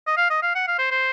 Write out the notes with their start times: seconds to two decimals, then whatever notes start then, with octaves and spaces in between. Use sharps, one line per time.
0.07 D#5
0.17 F5
0.30 D#5
0.43 F5
0.55 F#5
0.67 F5
0.79 C5
0.91 C5